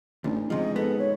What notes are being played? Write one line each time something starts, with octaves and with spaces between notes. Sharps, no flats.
A1 D2 D#4
G#2 C3 F3 D#5
B3 A4
C#5